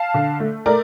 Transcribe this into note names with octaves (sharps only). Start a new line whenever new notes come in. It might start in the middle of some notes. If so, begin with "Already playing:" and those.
Already playing: F5 A5
D3
A3
A3 A#4 D5